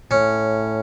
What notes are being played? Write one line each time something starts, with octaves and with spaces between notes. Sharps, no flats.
A2 C#4